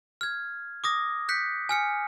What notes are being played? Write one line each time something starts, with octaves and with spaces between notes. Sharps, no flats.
F6 G#6
D6 D#6 A#6
F#6 G6 B6 C#7
G#5 F6 C#7